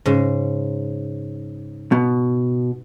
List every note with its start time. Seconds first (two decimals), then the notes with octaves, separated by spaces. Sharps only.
0.05 G#2 C#3
1.92 B2